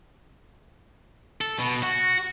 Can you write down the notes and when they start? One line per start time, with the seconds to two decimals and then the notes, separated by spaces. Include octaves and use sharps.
1.41 A4
1.59 B2
1.83 F#4